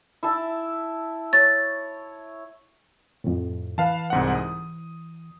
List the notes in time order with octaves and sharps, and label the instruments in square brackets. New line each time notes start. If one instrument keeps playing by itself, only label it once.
[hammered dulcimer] E4 E5 A5
[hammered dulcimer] C#5 [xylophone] A6
[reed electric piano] F2 A2
[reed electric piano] E3 [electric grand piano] B4 F5 A5
[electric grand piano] C2 G#2 F#5
D#6